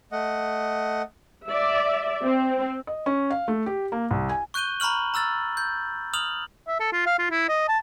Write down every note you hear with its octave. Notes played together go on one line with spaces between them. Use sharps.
A3 D#5 F#5
D5 E5
C4
D#5
C#4
F5
A3
G4
A#3
C2
G#5
C#6 F#6 G6 D#7 G7
A#5 B5 C#6 F6 F#7
A#5 E6 F6 A6
G6
D#6 F6 F7 F#7
E5
A4
F4
F5
F4
E4
D#5
A5